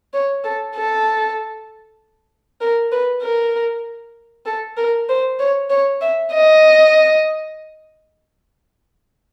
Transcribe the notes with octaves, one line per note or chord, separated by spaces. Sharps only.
C#5
A4
A4
A#4
B4
A#4
A4
A#4
C5
C#5
C#5
E5
D#5